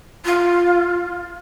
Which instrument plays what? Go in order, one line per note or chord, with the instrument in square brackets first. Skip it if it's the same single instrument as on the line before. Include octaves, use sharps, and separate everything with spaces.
[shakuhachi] F4